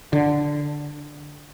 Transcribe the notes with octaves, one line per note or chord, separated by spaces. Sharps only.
D3